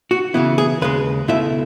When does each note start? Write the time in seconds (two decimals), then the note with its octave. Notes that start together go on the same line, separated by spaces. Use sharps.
0.11 F#4
0.34 C#3 E3 B3 E4
0.58 G#4
0.81 D#2 C#3 G#3 B4
1.28 C#2 B2 A3 E4 E5